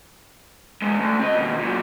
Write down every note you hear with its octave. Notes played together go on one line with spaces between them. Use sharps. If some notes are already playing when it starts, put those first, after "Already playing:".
G#3 B3
D3 A3
C4 D#5
D#2 B2
A#2 F#3